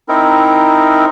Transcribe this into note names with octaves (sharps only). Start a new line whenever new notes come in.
C4 D#4 E4 A#4